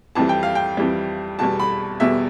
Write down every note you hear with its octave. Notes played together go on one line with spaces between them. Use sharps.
F2 E3 G3 A5
G5
F5
G5
F2 E3 G3
E2 B2 G3 A5
B5
E2 B2 G3 E5